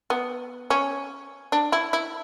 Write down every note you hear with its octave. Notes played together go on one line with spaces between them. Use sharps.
B3
C#4
D4
E4
E4